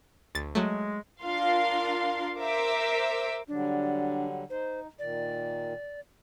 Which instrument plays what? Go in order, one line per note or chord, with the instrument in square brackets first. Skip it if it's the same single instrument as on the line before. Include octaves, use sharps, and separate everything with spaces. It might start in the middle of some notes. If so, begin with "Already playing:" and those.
[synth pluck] D2 A6
[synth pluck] F#3 A3 [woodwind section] G#3
[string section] D4 F4 A#4 F5 C6
A#4 C5 E5 D6 E6
[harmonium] D3 F#3 G3 [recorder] D4
[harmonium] D#4 [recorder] C5
[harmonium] A#2 D#3 [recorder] D5